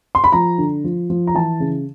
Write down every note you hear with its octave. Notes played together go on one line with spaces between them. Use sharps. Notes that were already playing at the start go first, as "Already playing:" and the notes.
C6
B5
F3 A#5
D3
F3
F3
A#5
E3 A5
C#3